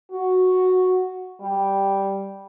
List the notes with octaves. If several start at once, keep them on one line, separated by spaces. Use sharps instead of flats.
F#4
G3